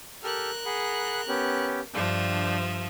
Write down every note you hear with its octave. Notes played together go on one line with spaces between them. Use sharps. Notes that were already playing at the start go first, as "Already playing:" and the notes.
G4 A4 A#4 F6 F#6
G#4 F#5 B5
B3 C#4 G4
G2 F3 D4 E5 G5